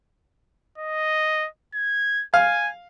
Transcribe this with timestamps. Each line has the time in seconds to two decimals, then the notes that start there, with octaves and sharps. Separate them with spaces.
0.78 D#5
1.74 G#6
2.34 F5 G#5